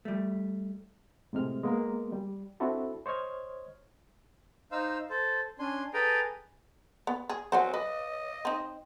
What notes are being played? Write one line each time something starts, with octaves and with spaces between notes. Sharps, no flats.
G3 A3
A2 C3 G#3 F6
G#3 A#3 B3 A#4
G3
C4 D4 E4 F#4 A4
C5 C#5 D#5 F6 G#6
D#4 C5 F5 E6
A4 C5
C#4 D4 G#5 C6
G#4 A4 B4 G5 G#5 A#5
B3
G#4
F#3 C5 F#5 G#5
B4 D#5
C4 D#4